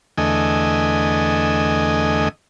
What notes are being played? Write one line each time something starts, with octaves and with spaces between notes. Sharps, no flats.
E2 D3 A3 D#5 G#5